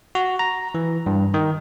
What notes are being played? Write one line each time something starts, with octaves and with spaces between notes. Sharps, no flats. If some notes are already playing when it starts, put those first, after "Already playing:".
F#4
A#5
E3
G2
D#3